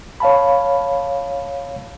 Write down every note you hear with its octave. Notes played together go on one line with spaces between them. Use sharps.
C#5 F5 A5 B5